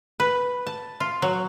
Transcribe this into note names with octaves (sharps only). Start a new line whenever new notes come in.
B4
A5
F4
F#3